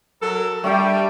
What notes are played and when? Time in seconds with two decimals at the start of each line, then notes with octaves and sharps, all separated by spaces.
0.22 F#3 A4 A#4
0.64 G3 A3 D4 G5